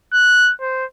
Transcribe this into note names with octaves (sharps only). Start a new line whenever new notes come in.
F#6
C5